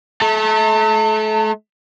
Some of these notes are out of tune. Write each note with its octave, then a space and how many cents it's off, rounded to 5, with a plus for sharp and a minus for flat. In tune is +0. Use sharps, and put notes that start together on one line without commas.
A3 -35 A5 +40